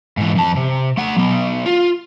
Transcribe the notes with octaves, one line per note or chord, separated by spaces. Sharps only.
G#2 E3
F2 A5
C3
A3 F#5
F#3 B3
F4